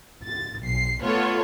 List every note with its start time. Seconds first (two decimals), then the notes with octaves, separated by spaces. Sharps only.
0.25 A6
0.63 B1 C7
1.04 A3 B3 F4 A4 B4 C#5